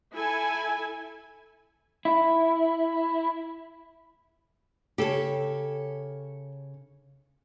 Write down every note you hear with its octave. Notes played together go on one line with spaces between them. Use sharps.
E4 A4 G#5
E4
C#3 G4 A4 C#5